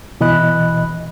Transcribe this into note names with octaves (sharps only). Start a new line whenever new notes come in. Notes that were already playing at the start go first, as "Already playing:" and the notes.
B2 E3 D#5 B5 F#6